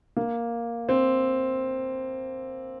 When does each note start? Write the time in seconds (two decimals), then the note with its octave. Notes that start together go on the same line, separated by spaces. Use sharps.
0.17 A#3
0.89 C4